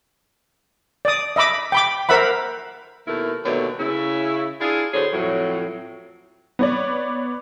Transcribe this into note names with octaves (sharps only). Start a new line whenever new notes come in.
D5 D#6
D#5 E5 B5 D6
G5 B5 D6
A#4 C5 E5 F#5 B5
D#2 B2 A3 E4 A#4
D#2 B2 D3 F#3 A3 C#5
C#3 E4
D4 E4 F4 G#4
A2 D3 F#3 G#4 C5 C#5
F2 A2 F#3
B3 C#5 D5